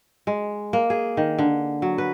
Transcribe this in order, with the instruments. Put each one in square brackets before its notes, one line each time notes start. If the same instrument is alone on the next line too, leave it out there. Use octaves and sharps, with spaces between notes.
[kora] G#3
A#3
G#4
D#3
D3
F#3
B4